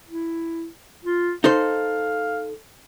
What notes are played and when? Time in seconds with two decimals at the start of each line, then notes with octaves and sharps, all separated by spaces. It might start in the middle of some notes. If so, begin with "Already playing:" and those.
0.08 E4
1.05 F4
1.44 D#4 A4 C5 F5